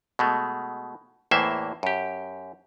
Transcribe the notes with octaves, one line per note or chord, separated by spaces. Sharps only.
B2 G#3 A3
E2 A2 E3 A#3 C5 E5
F#2 G4